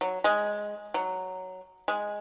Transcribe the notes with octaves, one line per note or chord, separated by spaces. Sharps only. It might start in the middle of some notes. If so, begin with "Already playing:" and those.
F#3
G#3
F#3
G#3